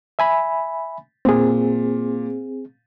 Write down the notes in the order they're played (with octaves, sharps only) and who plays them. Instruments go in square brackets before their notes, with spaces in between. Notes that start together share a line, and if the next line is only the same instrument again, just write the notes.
[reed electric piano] E5 G#5 B5
[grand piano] A#2 [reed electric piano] C4 G#4